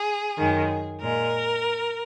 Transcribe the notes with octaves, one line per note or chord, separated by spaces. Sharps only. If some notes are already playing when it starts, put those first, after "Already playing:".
Already playing: G#4
F#2 D#3 G#3
A#2 G#3 A#4